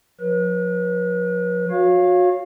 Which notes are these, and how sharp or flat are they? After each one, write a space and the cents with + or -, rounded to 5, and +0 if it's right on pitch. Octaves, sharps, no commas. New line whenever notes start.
F3 +45 B4 -45
F#4 -30 C#5 +0 F5 +0